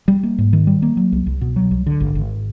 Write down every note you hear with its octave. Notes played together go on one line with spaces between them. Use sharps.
G3
A#3
G#2
D#3
G3
A#3
F#3
C2
C2
B2
F#3
C2
D3
G#1
G#1